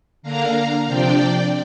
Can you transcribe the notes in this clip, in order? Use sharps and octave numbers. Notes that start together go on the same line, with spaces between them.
D3 A#3 D4 F5 A#5
C3 F3 D4 D5 G5